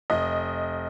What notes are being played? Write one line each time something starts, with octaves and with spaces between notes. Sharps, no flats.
F1 D#5